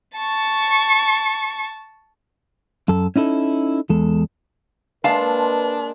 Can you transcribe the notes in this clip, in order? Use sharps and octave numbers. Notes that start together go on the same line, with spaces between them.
A5 C#6
F#2 A4
C#4 D#4 E4 A4
E2 G#3 A4
G#3 A#3 D4 B4 F5 A5